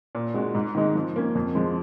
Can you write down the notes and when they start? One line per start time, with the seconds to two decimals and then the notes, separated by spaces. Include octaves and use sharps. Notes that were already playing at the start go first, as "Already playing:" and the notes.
0.15 A#2
0.34 G#3 D#4 F#4
0.55 G#2
0.75 D#3 G#3 D#4
0.95 F3
1.16 A#3 C#4
1.35 F2
1.55 F3 G#3